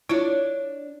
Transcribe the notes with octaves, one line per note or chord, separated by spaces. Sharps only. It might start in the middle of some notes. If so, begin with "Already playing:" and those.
D4 E4 F4 C#5